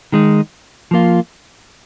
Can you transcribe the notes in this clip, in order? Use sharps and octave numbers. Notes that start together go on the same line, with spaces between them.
D#3 G#3 D#4
F3 A#3 F4